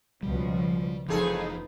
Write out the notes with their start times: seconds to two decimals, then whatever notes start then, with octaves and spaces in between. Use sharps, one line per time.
0.23 C#2 B2 F3 G3
1.09 F1 F2 E3 D#4 F4 G#4 A4 B4